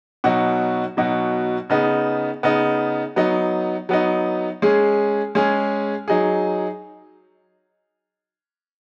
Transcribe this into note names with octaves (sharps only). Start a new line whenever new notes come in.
B2 F#3 D#4 F#4
B2 F#3 D#4 F#4
C#3 B3 D#4
C#3 B3 D#4
F#3 B3 D#4
F#3 B3 D#4
G#3 C#4 G#4
G#3 C#4 G#4
F#3 D#4 G#4